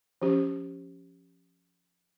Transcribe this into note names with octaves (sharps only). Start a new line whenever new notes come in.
F3 C#4 G4